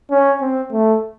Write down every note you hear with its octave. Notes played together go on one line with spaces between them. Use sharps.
C#4
C4
A3